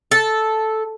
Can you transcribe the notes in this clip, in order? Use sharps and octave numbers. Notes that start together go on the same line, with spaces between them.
A4